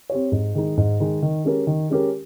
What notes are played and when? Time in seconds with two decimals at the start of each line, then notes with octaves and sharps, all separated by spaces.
0.10 C4 G4 C#5
0.32 G#2
0.55 D#3 G#3 D#4
0.77 G#2
1.00 D#3 G#3 D#4
1.22 D#3
1.45 G#3 C#4 G4 A#4
1.67 D#3
1.90 G#3 C#4 G4 A#4